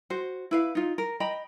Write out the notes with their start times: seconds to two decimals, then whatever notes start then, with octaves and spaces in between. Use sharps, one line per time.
0.10 F#4 C5
0.51 E4 B4 F5
0.75 D#4 F4
0.98 A#4
1.20 D#5 G5 A#5 B5